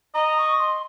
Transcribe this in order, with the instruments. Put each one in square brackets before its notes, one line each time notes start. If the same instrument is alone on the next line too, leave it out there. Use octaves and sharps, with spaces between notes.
[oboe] D#5 [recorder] A#5
[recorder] C#6
C6